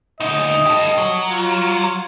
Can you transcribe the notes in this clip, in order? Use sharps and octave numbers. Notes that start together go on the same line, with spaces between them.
D2 D#4 D#5
G4 A4
F#3
F4